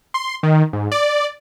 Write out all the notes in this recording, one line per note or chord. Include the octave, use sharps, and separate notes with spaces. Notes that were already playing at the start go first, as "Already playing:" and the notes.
C6
D#3
G#2
D5